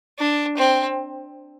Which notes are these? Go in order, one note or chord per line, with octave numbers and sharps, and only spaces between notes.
D4
C4